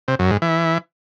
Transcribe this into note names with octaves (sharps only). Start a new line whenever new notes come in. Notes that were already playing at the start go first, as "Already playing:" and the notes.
C3
F#2
G#2
E3